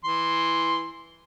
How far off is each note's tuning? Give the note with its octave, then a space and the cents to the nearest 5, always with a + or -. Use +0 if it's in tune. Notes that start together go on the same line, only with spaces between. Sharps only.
E3 +0 C6 +0